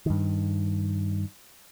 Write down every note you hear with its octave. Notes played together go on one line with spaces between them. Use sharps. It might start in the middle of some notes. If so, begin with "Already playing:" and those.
G2 D#3